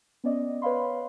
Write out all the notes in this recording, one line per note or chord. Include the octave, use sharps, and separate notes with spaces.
B3 C#4 D5 D#5
B4 C#5 D#5 F5 B5 C6